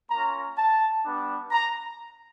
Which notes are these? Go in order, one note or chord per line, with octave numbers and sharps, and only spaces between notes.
A#3 C#4 F4 A#5
A5
G3 B3 D4
A#5